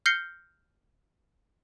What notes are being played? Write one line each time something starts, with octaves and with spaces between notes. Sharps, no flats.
F6 G6 A#6 C7 C#7 G7